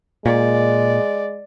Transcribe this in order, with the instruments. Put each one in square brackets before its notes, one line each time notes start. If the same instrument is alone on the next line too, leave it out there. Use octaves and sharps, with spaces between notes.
[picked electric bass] A#2 [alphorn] G#3 [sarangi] D5